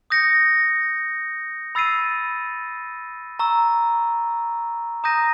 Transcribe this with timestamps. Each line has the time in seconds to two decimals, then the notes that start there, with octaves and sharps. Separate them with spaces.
0.10 D#6 G6 A#6 C#7
1.75 B5 E6 A6 C7 D#7
3.39 A#5 C#6 E6
5.04 A#5 D#6 G6 A#6 D#7